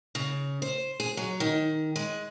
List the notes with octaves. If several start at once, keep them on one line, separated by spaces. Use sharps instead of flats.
C#3
C5
G#4
F#3
D#3
G#3